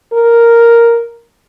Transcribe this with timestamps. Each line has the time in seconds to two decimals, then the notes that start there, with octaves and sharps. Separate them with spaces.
0.13 A#4